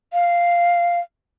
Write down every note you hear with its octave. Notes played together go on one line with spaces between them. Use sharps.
F5